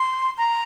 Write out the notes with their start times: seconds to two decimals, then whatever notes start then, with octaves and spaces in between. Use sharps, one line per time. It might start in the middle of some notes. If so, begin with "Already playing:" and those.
Already playing: C6
0.38 A#5